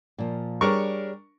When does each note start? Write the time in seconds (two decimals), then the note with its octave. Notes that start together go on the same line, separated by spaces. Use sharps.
0.18 A#2 F3
0.61 G3 D4 G#4 A#4 C#5 C#6